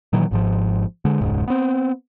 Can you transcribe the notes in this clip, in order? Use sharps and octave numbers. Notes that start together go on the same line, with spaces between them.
A#2 D#3 E3 F#3
G#1 G#2 F3
D3 G#3
E1 C#2 G#2
B3 C4